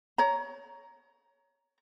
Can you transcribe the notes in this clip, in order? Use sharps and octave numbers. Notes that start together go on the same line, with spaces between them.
C#5 A#5